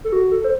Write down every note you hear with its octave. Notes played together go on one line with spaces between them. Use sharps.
A4
F#4
A4
C5